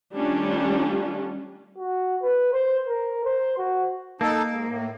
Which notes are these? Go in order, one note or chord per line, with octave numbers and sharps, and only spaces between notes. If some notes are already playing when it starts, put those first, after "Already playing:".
D#3 G3 A3 C#4 D4 F4
F#4
B4
C5
A#4
C5
F#4
A#3 D#4 A4 A5
G#2
A2